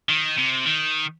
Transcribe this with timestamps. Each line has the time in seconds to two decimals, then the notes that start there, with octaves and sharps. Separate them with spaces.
0.09 D#3
0.38 C3
0.66 D#3